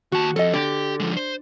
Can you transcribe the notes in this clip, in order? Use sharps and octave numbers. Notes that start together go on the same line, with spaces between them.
D#2 F#4 A5
F2 A4 D#5
D3 G4
F3 G#3
C5